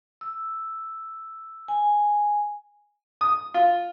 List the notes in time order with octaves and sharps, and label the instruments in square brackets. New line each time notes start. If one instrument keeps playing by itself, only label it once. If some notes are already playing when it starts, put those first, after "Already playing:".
[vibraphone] E6
G#5
[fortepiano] D#6
F4